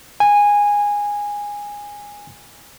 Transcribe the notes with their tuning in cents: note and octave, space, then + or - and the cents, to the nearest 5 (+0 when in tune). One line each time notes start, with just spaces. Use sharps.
G#5 -15